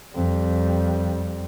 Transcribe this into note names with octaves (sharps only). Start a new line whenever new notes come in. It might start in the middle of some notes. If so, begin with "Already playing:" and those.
F2 G3